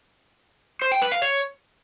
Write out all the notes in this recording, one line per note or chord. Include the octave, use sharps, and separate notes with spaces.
C5
G5
B4
F5
C#5